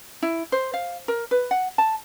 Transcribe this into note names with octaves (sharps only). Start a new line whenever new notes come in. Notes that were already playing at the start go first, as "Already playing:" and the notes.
E4
C5
F5
A#4
B4
F#5
A5